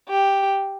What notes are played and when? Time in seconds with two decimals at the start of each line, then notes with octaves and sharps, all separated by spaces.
0.08 G4